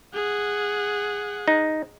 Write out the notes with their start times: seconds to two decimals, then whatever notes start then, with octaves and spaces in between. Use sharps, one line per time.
0.14 G#4 F#5
1.48 D#4